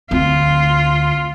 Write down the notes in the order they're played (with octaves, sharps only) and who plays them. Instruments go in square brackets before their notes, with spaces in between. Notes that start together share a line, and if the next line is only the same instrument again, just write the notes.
[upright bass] D2 C4 [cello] F4